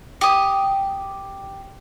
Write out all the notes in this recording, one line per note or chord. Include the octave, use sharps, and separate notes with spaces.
G4 D#6